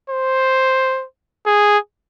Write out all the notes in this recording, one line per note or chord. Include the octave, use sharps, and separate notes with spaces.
C5
G#4